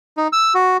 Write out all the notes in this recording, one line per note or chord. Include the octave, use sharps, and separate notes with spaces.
D#4
E6
F#4